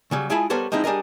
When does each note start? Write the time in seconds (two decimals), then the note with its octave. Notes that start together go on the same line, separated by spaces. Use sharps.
0.11 C#3 F#3 G3
0.30 G#3 E4 F4 G#4 A5 B5
0.50 G3 B3 A4 A#4 C5 C#5
0.72 F3 G#3 C4 D#4 E4
0.84 G3 D4 G#4 A#4 D#5